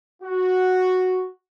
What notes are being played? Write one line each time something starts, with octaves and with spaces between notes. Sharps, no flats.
F#4